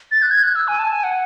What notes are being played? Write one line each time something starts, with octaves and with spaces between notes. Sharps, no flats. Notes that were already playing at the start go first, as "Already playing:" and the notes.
A6
F#6
G#6
F#6
E6
G#5
A5
G#5
F#5